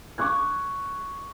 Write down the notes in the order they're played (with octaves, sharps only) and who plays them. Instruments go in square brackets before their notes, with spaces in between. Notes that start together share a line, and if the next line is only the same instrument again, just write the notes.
[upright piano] C#6 D6 F#6 G#6